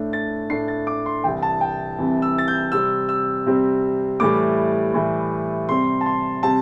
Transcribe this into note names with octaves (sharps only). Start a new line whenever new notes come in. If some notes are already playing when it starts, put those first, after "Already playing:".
Already playing: A2 A3 D4
A6
A2 A3 D4 C7
A6
D6
C6
C2 C3 E3 G5
A5
G5
C2 C3 E3
E6
A6
G6
C3 G3 C4 E6
E6
C3 G3 C4
A2 E3 G3 D6
A2 E3 G3
C3 G3 C4 C6
A5
C6
C3 G3 C4 A5